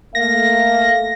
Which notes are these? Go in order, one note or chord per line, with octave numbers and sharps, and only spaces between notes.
A3 A#3 F5 A#6